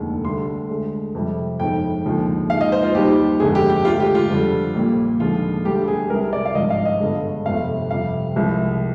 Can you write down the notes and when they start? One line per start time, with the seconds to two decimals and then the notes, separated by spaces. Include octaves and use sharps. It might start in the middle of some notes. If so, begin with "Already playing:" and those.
Already playing: F1 D#2 D3 G#3
0.25 D2 D3 G3 C6
0.69 D2 D3 G#3
1.15 F2 C3 G3
1.60 G1 F2 D#3 G#3 G5
2.05 D#2 D3 F3 G#3
2.50 D#2 D#3 G#3 F5
2.61 D#5
2.72 C5
2.83 F4
2.94 D#2 D#3 G3 G4
3.39 G1 F2 D3 G#3 G#4
3.55 G4
3.70 G4
3.85 D2 D3 G#3 F4
4.00 G4
4.15 F4
4.30 F2 D3 G3
4.75 A#1 A#2 G3
5.20 D#2 D3 F3 G#3 F4
5.65 D2 D3 G3 G4
5.88 G#4
6.10 C2 C3 G3 A#4
6.33 D5
6.45 F5
6.55 G#1 G2 F3 D#5
6.70 F5
6.85 D#5
7.00 G1 G2 D3 G#3
7.45 G1 F2 C3 F5
7.91 F2 C3 G3 F5
8.36 C2 C3 F3 G#3